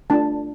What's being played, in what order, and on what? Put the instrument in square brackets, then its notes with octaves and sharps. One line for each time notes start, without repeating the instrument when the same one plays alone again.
[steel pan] A3 D4 F4 A5